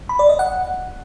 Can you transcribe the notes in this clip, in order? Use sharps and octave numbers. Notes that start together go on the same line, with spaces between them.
B5
D5
D#5
F#5